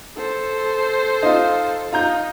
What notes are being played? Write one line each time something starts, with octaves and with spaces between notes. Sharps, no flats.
A4 C5
D#4 F4
D#4 F4 A#5 G6